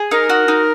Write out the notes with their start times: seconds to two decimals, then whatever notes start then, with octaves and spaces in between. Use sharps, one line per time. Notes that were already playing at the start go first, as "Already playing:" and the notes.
Already playing: G#4
0.11 D#4 A#4
0.29 F#4
0.48 D#4